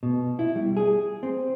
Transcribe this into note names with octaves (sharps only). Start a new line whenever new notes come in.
B2
E4
G3
G#4
C4